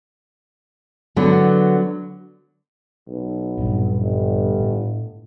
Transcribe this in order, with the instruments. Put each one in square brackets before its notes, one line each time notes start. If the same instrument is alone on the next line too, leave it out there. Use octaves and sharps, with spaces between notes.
[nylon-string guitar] D3 F#3 B3
[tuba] B1
[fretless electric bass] A#1 G2 C4
[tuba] G1
[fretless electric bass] A2